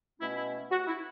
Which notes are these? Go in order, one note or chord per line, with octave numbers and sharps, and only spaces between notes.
B2 A3 C#4 E4
E4
F#4
E4